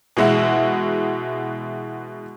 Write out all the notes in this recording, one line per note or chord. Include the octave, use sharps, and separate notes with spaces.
B2 E3 G#3 E4 F#4